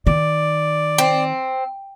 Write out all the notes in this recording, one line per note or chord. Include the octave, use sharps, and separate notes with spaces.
D#3 D5
C4